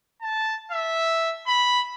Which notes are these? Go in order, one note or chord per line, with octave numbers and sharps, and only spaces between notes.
A5
E5
B5